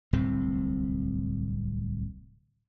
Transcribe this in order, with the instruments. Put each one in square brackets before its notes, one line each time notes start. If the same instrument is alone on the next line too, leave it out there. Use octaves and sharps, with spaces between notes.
[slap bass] D1 C2 A2 C4